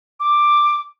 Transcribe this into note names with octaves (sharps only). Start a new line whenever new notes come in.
D6